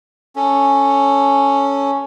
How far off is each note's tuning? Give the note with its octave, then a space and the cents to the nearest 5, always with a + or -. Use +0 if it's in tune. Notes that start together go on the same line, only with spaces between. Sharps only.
C#4 +0 A4 +0